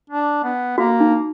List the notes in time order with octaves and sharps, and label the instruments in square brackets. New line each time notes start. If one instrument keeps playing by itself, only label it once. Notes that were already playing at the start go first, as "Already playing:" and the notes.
[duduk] D4
B3
[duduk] A#3 [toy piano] F#4
[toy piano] D#4